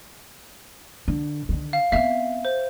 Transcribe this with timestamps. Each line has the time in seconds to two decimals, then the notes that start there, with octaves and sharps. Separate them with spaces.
1.08 D3
1.49 D3 D#3
1.73 F5
1.92 B3 C4 E5 F5
2.45 C5